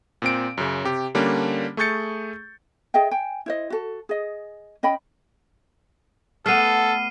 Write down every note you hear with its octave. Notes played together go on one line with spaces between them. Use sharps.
A#2 C4 D7
F#2 C#3
C3 G4
D3 G3 A#3 C#4 D4
A3 G#4 C#6 G6 A6 C#7
G#4 D#5 E5 G5
G5 G#5
E4 C5 D#5
F#4 A4
G#4 D#5
C#4 D#5 G5 B5
A3 B3 A4 F6 C7 D#7